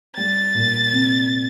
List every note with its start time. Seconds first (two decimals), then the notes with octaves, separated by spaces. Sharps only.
0.17 G3 A6
0.55 A#2
0.92 C3